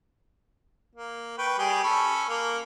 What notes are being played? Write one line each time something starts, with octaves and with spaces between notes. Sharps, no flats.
A#3
B4 G5 C#6
G3 G4 G#4
C#4 A4 B5
A#3